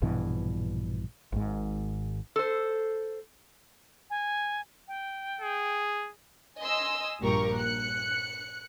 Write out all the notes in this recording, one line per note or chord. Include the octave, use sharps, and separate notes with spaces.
A#1 G2 B2 E3
G#1 G#2
A4 C5
G#5
G5
G#4
D#5 G#5 C6 D#6 E6
A#1 G2 A#2 G4 A#4 C#6
F#6 C#7